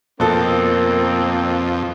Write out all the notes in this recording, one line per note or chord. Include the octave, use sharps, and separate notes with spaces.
F2 B2 A#3 C4 A4